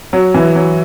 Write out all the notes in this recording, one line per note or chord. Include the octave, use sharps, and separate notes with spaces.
F#3
E3
F#3